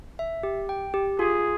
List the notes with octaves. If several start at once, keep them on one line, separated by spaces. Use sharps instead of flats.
E5
G4
G5
G4
F4 G#4